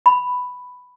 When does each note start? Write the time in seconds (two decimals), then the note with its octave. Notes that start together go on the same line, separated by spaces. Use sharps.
0.06 B5